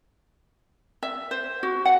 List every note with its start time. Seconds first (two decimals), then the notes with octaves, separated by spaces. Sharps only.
1.03 E5
1.31 C5
1.63 F#4
1.85 F#5